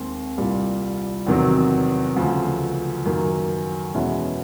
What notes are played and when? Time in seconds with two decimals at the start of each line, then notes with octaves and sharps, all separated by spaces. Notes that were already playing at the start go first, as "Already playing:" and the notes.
Already playing: D#2 D#3 G#3 C4
0.37 C2 A#2 G3
1.27 E2 C3 D#3 F#3
2.16 D2 C#3 F3
3.06 F#2 D#3 F#3 A#3
3.94 E2 B2 G#3 C#4 E4